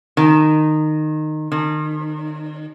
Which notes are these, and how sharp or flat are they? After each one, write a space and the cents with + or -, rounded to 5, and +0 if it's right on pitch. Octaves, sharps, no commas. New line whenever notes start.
D#3 -15
D#3 -30